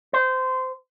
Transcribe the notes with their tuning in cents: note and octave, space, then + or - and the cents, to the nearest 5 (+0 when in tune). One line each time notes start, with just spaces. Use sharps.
C5 -20